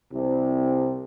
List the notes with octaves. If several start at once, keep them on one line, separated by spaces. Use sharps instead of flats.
C2 C3